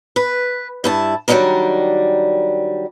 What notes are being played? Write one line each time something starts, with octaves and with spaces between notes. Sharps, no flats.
B4
G2 E4 A5
D#3 F#3 G3 B3 D4 A#4